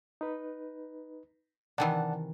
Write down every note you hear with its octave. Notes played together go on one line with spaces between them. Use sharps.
D#4 B4
C3 D#3 E3 D5 F#5 A5